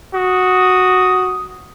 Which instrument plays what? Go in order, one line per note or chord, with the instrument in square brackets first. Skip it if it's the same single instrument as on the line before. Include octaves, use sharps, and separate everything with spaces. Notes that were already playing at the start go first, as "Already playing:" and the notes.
[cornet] F#4 [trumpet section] D#6